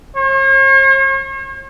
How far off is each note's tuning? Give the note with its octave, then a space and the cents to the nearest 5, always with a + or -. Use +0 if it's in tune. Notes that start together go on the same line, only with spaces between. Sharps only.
C#5 -45